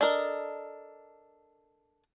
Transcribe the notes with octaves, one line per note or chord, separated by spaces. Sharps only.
D4 A4 A#4 D#5